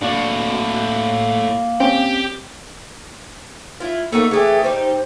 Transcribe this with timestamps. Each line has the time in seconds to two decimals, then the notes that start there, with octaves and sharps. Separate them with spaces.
0.02 A2 A#3 D4 F#4 D5
1.80 C4 C#4 G4 G5
3.80 E4 F4
4.12 A3 A#3 D#4 F#4
4.31 E3 A3 G4 G#4
4.63 G3 D#4 G4 C5